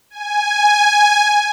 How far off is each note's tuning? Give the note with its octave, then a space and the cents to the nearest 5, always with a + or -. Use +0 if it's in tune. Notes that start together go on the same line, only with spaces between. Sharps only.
G#5 +0